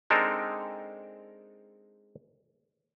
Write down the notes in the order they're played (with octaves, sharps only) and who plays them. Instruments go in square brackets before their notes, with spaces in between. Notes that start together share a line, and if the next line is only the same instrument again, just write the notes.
[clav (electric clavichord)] G#3 C4 D4 D#4 A4 A#4